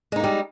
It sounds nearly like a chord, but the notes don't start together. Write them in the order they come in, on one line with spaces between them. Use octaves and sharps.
G#3 D#4 A#3 G3